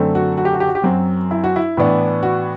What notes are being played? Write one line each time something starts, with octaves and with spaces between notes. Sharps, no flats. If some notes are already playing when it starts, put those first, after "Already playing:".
Already playing: F#2 D3 A3 C4
F#4
F#4
G4
F#4
G4
F#4
G4
F#2 F#3 C4 F#4
E4
F#4
E4
A2 E3 B3 D4
F#4